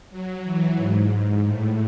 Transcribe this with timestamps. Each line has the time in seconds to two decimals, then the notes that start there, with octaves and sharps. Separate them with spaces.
0.10 F#3
0.44 E3
0.76 G#2
1.10 G#2
1.44 A2